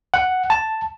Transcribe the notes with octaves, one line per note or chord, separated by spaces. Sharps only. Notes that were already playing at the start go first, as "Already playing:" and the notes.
F#5
A5